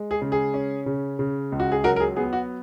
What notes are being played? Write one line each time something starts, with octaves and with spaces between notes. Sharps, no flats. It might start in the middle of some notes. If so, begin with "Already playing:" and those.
Already playing: G#3
G#4
C#3
G#4
C#4
C#3
C#3
C#2
F#4
G#4
F#3 F#4 A#4
A#4
G#4
B3 G#4
F#4